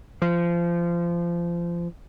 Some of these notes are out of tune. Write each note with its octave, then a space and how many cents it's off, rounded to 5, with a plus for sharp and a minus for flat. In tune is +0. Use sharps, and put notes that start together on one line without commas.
F3 -25